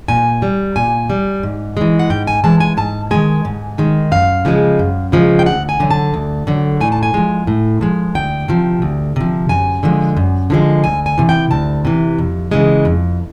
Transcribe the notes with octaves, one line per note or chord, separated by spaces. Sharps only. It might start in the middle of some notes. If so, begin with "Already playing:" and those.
A#2 G#5
G3
A#2 G#5
G3
G#2
E3 G#3
F#5
G#2 G5
G#5
E3 G#3 A5
G#5
G#2 A5
D#3 G#3 G#5
G#2
D#3 G#3
F#2 F5
C#3 F3 G#3
F#2
C#3 F3 G#3
G5
D2 F#5
G#5
D3 F#3
A5
D2
D3 F#3
A2 G#5
A5
G#5
F3 G#3
A2
F3 G#3
D2 G5
C3 F3
D2
C3 F3
F#2 G#5
D3 F3 G#3
F#2
D3 F3 G#3
D2 G#5
G#5
C3 E3
G5
D2 A5
C3 E3
F2
C#3 E3 G#3
F2